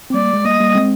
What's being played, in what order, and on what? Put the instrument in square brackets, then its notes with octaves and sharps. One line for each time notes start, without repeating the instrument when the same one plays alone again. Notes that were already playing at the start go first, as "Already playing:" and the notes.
[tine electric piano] C4
[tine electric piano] G3 A#3 [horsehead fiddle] D5
[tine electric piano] G#3
[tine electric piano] G3 A#3 [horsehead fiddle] D#5
[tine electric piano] G3 A#3
G#3 C4